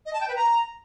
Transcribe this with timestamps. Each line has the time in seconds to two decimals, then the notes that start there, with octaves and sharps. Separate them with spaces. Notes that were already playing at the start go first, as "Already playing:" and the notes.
0.06 D#5
0.13 A5
0.21 G5
0.28 B4
0.36 A#5